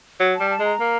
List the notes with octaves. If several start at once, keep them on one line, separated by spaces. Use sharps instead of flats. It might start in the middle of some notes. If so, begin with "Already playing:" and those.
F#3
A5
G3
A5
G#3
A#5
A#3